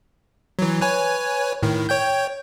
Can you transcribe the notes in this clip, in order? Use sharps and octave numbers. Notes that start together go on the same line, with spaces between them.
E3 F#3
B4 C#5 G#5
A2 D#3
C#5 G5 G6